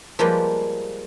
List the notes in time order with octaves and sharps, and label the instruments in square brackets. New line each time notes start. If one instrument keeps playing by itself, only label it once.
[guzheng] F3 G3 G#3 A#3 G4 B4